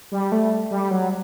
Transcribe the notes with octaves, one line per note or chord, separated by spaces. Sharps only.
G3
A3
G3
F#3